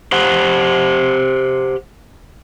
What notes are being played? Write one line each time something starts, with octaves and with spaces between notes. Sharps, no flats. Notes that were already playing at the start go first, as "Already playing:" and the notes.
G4 C5 F#5